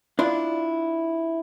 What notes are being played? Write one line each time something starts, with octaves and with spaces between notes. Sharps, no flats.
D4 E4 F4 D5